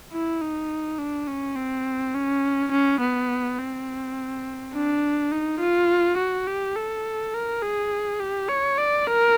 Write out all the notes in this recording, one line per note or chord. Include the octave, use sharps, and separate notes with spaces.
E4
D#4
D4
C#4
C4
C#4
C#4
B3
C4
D4
D#4
F4
F#4
G4
A4
A#4
G#4
G4
C#5
D5
A#4